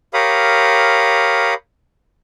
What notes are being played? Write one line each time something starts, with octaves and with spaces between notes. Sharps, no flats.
G4 A#4 C#5 F5 B5 D#6